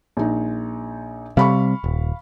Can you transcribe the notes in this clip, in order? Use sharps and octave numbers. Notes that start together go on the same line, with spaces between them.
A#1 D#4
C3 G3 F5 B5 C#6
D#1